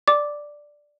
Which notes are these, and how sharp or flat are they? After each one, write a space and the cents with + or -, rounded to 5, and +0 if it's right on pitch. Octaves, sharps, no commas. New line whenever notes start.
D5 +0 D6 +0